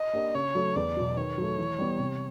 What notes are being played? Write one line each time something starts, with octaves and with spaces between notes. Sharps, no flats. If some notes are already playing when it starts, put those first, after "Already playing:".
Already playing: D#5
A#3 D4 G4
C#3 C#5
F#3 A3 C#4
E2 D5
B2 F#3
D#3 C#5
F#3 A3
E3
G3 B3
C3